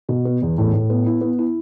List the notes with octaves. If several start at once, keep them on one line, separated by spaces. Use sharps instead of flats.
B2
B3
E2
A2
A2
B3
E4
B3
E4